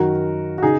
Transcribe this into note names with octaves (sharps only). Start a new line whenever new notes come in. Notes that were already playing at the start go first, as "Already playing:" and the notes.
Already playing: F#2 D#3 F#3 F#4 A#4
F#4
C#3 D#4 G#4